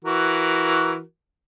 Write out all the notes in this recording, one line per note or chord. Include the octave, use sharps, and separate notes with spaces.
E3 F#4 A#4